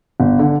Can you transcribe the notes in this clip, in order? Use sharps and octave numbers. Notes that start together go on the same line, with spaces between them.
G1
D3